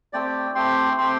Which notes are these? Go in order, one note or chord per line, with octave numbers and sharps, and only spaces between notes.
A3 C4 G4 D5 G5
A3 C4 G4 G5 C6
A3 C4 G4 G5 C6